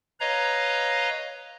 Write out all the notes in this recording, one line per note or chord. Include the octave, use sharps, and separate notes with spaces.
B4 C#5 D#5 F5 A#5